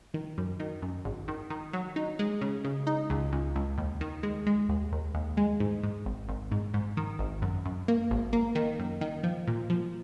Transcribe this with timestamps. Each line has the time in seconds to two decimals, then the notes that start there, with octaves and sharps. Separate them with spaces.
0.14 D#3
0.38 F#2
0.60 D#3
0.82 F#2
1.05 G#1
1.28 D#3
1.50 D#3
1.73 F#3
1.96 D#4
2.19 G#3
2.41 C#3
2.64 C#3
2.87 D#4
3.10 C#2
3.33 C#2
3.56 C#2
3.78 D#2
4.01 D#3
4.23 G#3
4.47 G#3
4.69 D#2
4.92 D#2
5.14 D#2
5.37 G#3
5.60 G#2
5.83 G#2
6.06 G#1
6.28 G#1
6.51 G#2
6.74 G#2
6.97 D#3
7.19 G#1
7.42 F#2
7.65 F#2
7.88 A#3
8.11 G#1
8.33 A#3
8.55 D#3
8.79 F#2
9.01 D#3
9.23 F3
9.47 A#2
9.70 F3